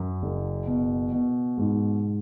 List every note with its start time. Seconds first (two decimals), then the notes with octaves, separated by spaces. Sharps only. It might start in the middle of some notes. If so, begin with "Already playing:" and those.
Already playing: F#2
0.22 F#1
0.67 B2
1.12 B2
1.57 G#2